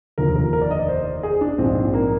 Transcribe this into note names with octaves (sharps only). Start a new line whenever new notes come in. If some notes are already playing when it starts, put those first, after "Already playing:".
F1 D#2 D3 F3 A#4
A#4
A#4
D5
D#5
D5
C5
G#4
D4
A#1 G#2 F3 C4
A#3